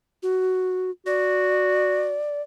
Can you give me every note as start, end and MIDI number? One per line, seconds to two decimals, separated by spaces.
0.23 0.91 66
1.06 2.20 66
1.06 2.42 74